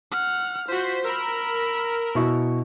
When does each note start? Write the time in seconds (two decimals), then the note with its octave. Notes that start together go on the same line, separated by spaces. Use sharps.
0.11 F#5 F6
0.68 F4 F#4 C5 B6
1.04 A#4 B5 E6
2.15 B2 E4 C#6